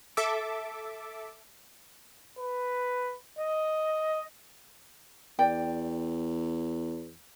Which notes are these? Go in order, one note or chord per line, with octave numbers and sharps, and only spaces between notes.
A4 E5 D6
B4
D#5
E2 D5 G5